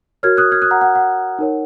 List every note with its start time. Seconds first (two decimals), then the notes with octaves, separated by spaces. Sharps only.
0.23 F#4 A#4 C#5 F6 G#6
0.37 D#6 F#6
0.52 F6 G#6
0.62 D#6 F#6
0.71 F#5 A#5
0.81 F#5
0.95 F#5
1.39 D#4 A#4 C#5